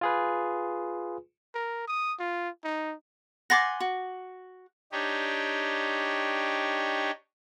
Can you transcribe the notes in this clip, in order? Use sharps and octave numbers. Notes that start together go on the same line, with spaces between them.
F4 G#4 B4
A#4
D#6
F4
D#4
F#5 G#5 C6 D6 A6 A#6
F#4
D4 D#4 G4 C#5